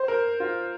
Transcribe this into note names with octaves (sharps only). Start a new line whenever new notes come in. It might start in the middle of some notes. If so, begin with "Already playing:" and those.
Already playing: C5
A#4
F4